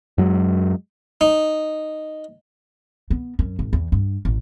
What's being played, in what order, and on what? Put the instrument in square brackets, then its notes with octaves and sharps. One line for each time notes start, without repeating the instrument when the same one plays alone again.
[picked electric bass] F#2 F#3 G#3
[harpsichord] D#4
[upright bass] B3
F#2
G#1
E2
G2
A1